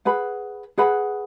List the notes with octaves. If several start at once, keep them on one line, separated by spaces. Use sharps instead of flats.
G#4 B4 F#5 B5
G#4 B4 F#5 B5